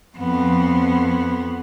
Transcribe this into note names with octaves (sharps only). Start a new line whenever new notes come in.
F2 B3